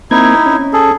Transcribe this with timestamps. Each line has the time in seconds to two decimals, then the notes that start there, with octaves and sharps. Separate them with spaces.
0.11 A#3 C4 D#4 E4 G#6
0.46 C#4
0.73 G#4 A4